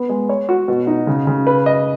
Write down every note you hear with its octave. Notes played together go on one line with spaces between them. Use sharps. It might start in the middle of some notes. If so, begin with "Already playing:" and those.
Already playing: B3
G#3
C#5
F#4
B2
D#4
C#3
C#3
B4
D#5